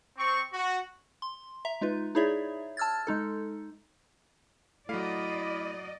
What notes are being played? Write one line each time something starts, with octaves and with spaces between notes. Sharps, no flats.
C4 C#6
F#4
C6
E5 A#5
G#3 D#4 F4 B4
D#4 E4 G#4 C#5 D5 E5
A5 E6 F6 G#6 A6
G#3 D#4 A4
F#3 A3 E4 D5 D#5 F5